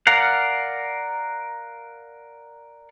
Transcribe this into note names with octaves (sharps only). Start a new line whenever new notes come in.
A#4 D5 F5 F#5